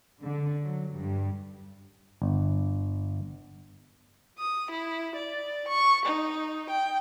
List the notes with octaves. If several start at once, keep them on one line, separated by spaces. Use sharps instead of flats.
D3
F#3
G2
G1
D#6
E4
D5
C#6
D#4
G5